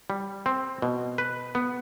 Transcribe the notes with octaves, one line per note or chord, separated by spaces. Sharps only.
G3
C4
B2
B4
B3